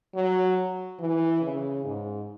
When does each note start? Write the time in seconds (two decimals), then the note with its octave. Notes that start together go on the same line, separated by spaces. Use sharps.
0.15 F#3
0.99 E3
1.42 C#3
1.85 G#2